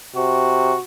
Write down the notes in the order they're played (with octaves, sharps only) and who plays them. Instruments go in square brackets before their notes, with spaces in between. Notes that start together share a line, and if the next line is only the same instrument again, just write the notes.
[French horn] C3 [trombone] F#4